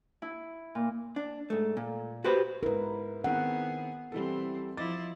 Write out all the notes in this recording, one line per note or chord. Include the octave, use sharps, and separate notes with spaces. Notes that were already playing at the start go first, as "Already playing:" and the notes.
E4
A#2
D4
G#2 A3
A#2
F#4 G4 B4 C5
G#2 E4 A#4 B4
D#3 B3 C4 E4 G#4 F#5
E3 G3 C4 E4 A4
F3 E4 D#5 D6 A6